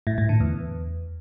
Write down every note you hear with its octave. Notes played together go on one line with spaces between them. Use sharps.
A2
A2
D3
E2